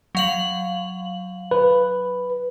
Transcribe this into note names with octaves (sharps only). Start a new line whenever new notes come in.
F#3 F5 F#7
B4